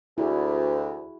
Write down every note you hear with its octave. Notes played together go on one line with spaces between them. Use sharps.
D2 E4 F#4 G#4